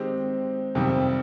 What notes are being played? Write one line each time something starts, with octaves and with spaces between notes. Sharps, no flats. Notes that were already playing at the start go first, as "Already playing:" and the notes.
Already playing: D#3 G#3 C4 D#4 G4
F2 C3 D#3 G3